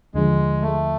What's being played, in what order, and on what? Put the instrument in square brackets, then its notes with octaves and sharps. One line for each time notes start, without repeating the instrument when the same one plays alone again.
[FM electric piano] D#2 D3 F3 [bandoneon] G#3
[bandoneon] A3